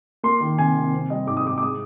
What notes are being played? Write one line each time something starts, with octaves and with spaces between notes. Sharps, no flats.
A#3 C6
D#3
C3 G#5
C3
C4
G3 D#5
G#2 D6
D#6
G#2 D6
D6
G#3 D#6